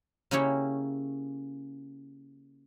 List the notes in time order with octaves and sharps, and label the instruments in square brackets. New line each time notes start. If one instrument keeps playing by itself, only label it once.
[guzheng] C#3 A#3 C#4 E4 G4 C#5